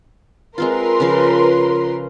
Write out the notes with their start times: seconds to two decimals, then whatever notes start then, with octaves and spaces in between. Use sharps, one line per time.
0.58 G#3 C4 F4 A#4 B4 C6
1.00 C#3 F3